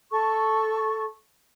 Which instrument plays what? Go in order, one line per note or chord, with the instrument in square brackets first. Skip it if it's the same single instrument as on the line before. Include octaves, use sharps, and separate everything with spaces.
[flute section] A4 C#6